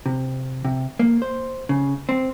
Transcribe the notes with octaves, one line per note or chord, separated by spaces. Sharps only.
C3
C3
A#3
C5
C#3
C4